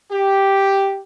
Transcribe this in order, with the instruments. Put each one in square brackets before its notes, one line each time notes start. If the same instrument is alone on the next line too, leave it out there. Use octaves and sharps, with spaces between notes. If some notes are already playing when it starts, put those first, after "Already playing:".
[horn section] G4